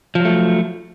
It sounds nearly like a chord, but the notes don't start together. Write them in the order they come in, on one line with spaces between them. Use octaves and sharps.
F3 F#3 A3